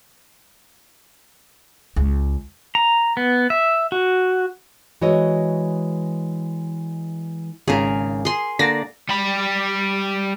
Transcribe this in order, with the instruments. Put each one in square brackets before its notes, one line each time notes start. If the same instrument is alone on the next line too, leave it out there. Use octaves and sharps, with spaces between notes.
[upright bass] C#2
[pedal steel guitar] A#5
B3
E5
F#4
[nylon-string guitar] E3 G#3 F#4 C#5 D#5
[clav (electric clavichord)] G#1 C#3 [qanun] G#4 A#4
[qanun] G#4 C6
[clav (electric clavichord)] D3 A#3 [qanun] D5 [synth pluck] A#6
[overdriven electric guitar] G3 B5